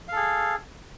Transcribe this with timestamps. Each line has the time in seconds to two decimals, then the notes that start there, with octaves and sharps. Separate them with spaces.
0.08 F5
0.12 A4
0.16 G#4